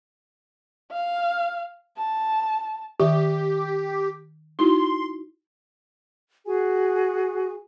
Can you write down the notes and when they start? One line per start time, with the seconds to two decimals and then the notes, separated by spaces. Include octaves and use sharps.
0.92 F5
1.97 A5
3.00 D#3 G4 E5 C#6
4.59 D#4 E4 F#4 C6
6.46 F#4 G#4 G#5